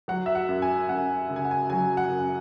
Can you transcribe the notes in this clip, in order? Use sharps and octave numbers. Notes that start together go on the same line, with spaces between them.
F#3 F#5
E5
F#5
F#2
G#5
F#2 F#5
C#3
G#5
F#5
G#5
F#3 G#5
F#5
F#2